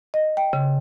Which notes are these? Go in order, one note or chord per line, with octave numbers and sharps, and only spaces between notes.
D#5
G5
C#3